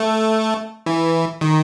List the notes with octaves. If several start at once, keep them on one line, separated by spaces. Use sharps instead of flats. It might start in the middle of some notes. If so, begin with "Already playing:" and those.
Already playing: A3
E3
D#3